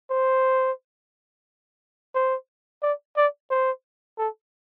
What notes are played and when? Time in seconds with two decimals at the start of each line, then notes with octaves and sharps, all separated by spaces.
0.10 C5
2.15 C5
2.83 D5
3.17 D5
3.51 C5
4.18 A4